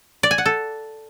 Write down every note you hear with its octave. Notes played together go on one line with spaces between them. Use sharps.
D5
G#5
F#5
A4